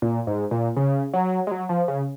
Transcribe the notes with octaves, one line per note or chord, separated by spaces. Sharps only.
A#2
G#2
A#2
C#3
F#3
G#3
F#3
F3
C#3